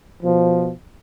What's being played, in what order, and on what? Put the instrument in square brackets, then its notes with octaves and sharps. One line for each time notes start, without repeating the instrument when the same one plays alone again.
[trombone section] B2 F3